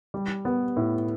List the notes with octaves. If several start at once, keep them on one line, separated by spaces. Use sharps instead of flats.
G3
B3
A2